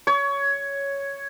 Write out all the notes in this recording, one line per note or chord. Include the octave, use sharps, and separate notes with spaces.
C#5